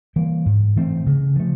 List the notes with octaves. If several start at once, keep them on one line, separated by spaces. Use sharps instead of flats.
E3 G3 A#3
G#2
E3 A3 C4
C#3
F3 A3